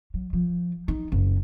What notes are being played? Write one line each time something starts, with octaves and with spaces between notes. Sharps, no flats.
F#3
F3
D#4
F#1